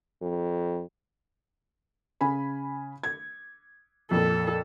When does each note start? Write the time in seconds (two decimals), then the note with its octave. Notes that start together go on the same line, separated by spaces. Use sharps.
0.22 F2
2.21 C#3 G#5 B5
3.03 G#6
4.11 F2 A#2 A4